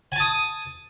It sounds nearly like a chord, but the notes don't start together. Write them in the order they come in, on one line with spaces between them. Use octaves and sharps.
G#5 A5 D#6